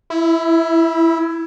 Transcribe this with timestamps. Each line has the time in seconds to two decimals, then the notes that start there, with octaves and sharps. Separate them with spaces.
0.10 E4